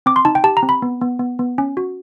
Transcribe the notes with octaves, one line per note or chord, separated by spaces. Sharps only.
C4 D6
C6
D#4 A5
G5
G4 A5
A#5
C4
B5
B3
B3
B3
B3
C#4
F#4